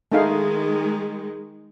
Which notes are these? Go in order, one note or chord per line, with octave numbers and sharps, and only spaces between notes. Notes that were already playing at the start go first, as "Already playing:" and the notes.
D#3 G#3 A3 D#4 F5